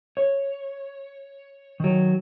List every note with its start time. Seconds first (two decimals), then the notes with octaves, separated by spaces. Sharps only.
0.17 C#5
1.80 D#3 F#3